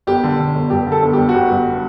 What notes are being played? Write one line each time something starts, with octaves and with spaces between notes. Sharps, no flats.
G1 G4
D3
D3
G1
G2 G4
D3
A4
G1
G1 G4
F#4
G1 G4
G2